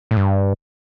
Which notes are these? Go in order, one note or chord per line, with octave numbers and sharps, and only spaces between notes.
A2
G2